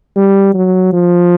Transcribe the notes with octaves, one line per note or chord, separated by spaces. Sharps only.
G3
F#3
F3